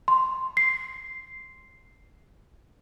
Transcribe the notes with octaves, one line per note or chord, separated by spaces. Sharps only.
C6
C7